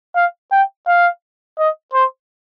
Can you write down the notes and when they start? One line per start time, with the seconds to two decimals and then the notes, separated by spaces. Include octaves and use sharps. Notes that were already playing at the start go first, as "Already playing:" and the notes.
0.16 F5
0.52 G5
0.87 F5
1.58 D#5
1.93 C5